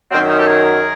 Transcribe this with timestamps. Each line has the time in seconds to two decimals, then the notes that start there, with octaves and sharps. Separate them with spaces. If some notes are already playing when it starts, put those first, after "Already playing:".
0.11 F#2 D#3 F#3 A#3 C4
0.29 C#4 D#4
0.38 G4 A4
0.47 G#4 A#4